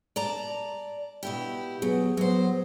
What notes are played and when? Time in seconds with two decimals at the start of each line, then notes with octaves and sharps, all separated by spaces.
0.16 D5 A5 A#5
1.23 B2 E4 G4
1.82 F#3 B3 G#4
2.17 F#3 B3 C5